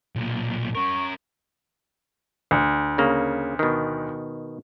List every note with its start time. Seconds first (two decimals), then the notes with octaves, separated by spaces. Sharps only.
0.16 B1 A#2
0.75 C#4 A#4 C#6
2.51 D2
2.98 C#3 A#3
3.59 B2 D#3